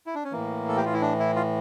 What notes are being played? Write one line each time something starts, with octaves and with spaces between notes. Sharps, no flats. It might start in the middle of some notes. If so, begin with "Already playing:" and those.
E4
D4
C#4
A2 E3 A#3
A4
G4
F4
E4
D4
E4
F4